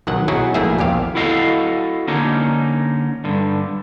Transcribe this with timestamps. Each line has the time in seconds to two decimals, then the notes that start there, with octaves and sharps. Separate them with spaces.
0.07 B1 D#3 F#3 F#5
0.28 B2 F#3 D#4 E4 F#4 G#4
0.54 A#1 A3 A#3 E4 G#4 E5
0.78 A#1 E2 G4 F5
1.15 E4 F#4 A4 D#5 F5
2.07 D3 A#3 C#4 D#4
3.24 G2 D3